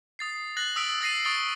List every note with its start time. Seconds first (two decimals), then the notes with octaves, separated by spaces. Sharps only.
0.19 D#6 A6 C7
0.57 F#6 A6 A#6 F#7
0.76 D#6 E6 F#6 B6 D7
1.01 E6 A6 A#6 C7 D#7
1.25 C#6 D#6 A6 D7 G7